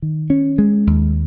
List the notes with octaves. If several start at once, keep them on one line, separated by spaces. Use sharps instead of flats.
D#3
C#4
G#3
D#2